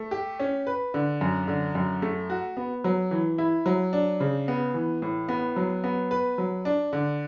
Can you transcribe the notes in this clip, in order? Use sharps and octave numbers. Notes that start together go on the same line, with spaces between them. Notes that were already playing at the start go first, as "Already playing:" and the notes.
Already playing: A3
G4
C#4
B4
D3
F#2
D3
F#2
A3
F#4
B3
F#3
E3
E4
F#3
D4
C#3
B3
E3
A2
B3
F#3
B3
B4
F#3
D4
D3